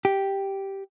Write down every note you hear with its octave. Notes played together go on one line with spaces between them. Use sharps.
G4